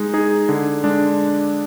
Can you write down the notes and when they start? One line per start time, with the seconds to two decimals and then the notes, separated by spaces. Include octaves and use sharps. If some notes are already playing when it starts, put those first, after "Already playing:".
Already playing: G#3 D#4 G#4
0.14 D#4 G#4
0.49 D3
0.84 G#3 D4